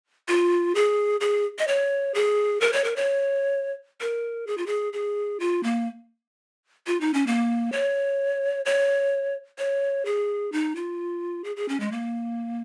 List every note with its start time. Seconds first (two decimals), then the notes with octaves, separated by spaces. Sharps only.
0.28 F4
0.75 G#4
1.21 G#4
1.59 D#5
1.68 C#5
2.14 G#4
2.61 A#4
2.73 C#5
2.84 A#4
2.96 C#5
4.01 A#4
4.47 G#4
4.57 F4
4.66 G#4
4.93 G#4
5.40 F4
5.63 A#3
6.87 F4
7.01 D#4
7.14 C#4
7.27 A#3
7.72 C#5
8.65 C#5
9.58 C#5
10.05 G#4
10.52 D#4
10.76 F4
11.44 G#4
11.56 G#4
11.69 C#4
11.80 G#3
11.92 A#3